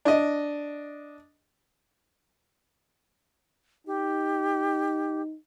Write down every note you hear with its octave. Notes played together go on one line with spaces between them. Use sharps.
D4 D#5
D#4 G4